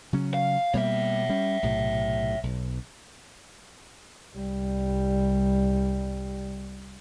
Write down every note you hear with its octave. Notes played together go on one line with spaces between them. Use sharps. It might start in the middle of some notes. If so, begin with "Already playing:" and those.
C#3 F#3 C#4
F5
B2 G3 A#3 C#5 E5
G3 C#4
B1 A2 C3
B1
C2 G3